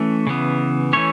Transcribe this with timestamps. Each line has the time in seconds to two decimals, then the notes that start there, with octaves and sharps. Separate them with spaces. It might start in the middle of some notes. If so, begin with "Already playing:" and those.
Already playing: E3 A3 C#4 E5
0.27 C#3 E3 B3
0.93 E3 A3 C#4 C#5